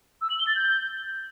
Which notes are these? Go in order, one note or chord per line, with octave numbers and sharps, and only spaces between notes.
E6
F#7
G7
A6
G6